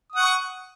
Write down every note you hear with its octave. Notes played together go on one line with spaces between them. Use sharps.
F#5 C#6 D#6